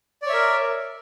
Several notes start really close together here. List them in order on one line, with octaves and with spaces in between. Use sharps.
D5 C#5 E5 A#4